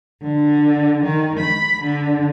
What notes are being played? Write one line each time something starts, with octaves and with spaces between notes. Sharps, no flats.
D3
D#3
B5
D3